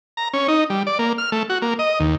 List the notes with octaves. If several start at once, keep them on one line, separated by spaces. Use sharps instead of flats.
A#5
C#4
D#4
G3
D5
A#3
F6
A3
F#4
A#3
D#5
D#2